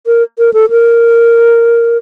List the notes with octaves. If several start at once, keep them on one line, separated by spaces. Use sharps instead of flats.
A#4
A#4
A4
A#4